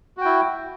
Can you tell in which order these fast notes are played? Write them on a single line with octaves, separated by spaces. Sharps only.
F#4 G5 E4